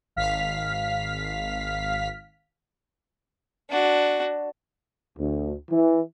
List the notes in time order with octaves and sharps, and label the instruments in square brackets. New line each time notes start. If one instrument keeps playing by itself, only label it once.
[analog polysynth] G#1 F5 F6 B6
[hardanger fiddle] D4 F#4
[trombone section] D2
E3